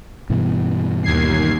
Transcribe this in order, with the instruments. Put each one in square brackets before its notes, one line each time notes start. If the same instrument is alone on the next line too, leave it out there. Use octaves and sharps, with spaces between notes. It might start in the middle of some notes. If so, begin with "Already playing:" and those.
[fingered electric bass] G2 B2 E3
[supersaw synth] D#2 G#6 C7